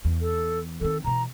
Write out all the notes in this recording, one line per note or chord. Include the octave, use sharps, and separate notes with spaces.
E2
A4
D#3 C4 A4
B2 E3 A#5